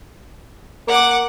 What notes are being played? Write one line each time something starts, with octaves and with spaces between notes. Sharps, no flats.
A#3 F#5 D6